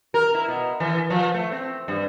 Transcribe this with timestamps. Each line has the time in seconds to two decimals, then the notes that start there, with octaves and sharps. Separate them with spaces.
0.14 A#4
0.34 E4
0.48 B2
0.80 E3
1.10 F3
1.34 A3
1.52 C4
1.88 G2